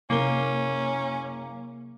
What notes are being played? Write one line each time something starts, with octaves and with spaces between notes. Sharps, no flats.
F#1 C3 A#3 C#4 A#4 G7